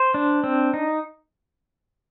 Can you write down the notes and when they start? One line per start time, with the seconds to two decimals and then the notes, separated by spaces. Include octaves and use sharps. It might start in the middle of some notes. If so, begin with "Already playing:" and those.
Already playing: C5
0.14 D4
0.44 C4
0.74 D#4